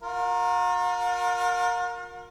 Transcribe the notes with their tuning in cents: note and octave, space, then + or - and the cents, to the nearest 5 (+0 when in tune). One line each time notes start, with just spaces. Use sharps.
F4 +45 A#4 +0